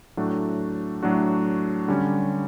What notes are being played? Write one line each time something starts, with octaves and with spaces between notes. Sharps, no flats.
A2 F#3 A3 D4 F#4
A2 F#3 A3 D4 F#4
D3 G3 C#4 G4